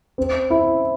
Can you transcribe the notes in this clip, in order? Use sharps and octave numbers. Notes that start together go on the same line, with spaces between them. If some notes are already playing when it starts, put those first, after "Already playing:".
C4
E4